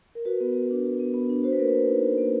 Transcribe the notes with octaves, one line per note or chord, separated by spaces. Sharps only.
A#4
F#4 B4
B3
B3
D4
F#4
B3
B3
D4
F#4 C5
B4
A#3 A#4
B4
A#3
D#4
F#4
A#3